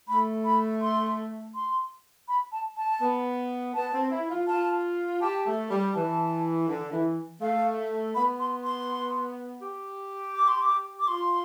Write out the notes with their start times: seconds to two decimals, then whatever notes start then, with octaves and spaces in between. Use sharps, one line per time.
0.08 A3 B5
0.45 B5
0.82 C6
1.55 C6
2.28 B5
2.52 A5
2.77 A5
3.02 B3
3.75 B3 A5
3.93 C4
4.11 E4
4.30 F4
4.48 F4 A5
5.21 G4 A5
5.46 A3
5.70 G3
5.94 E3 A5
6.67 D3
6.92 E3
7.41 A3 F5
8.15 B3 B5
8.40 C6
8.63 C6
9.61 G4
10.35 D6
10.48 C6
10.62 D6
11.00 D6
11.08 F4 C6